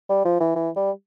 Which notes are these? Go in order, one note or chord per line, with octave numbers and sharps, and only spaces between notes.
G3
F3
E3
E3
G3